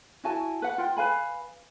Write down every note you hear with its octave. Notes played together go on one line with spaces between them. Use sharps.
E4 F#4 G#5 A5
B4 F#5
F4 G5
B4 F5 G#5 B5